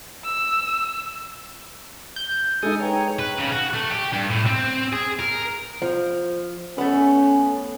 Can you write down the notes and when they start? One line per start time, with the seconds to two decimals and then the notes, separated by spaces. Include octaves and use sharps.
0.24 E6
2.16 G6
2.63 G#3 D#4 A4 G#5 D#6
2.80 B4 C#5 G5 A#5
3.19 B4
3.38 C#3
3.52 F#4
3.74 A3
3.90 G4
4.13 G2
4.30 A2
4.46 C4
4.93 G#4
5.20 A#4
5.82 F3
6.78 A3 B3 C#4